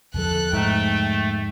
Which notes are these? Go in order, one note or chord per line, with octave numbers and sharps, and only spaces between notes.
E2 D3 F3 A4 F#6
G#2 A3 G5